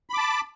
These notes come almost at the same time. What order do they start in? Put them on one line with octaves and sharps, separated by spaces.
B5 D6 A5